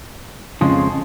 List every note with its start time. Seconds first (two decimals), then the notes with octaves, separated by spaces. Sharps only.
0.61 F2 C#3 F3 G#3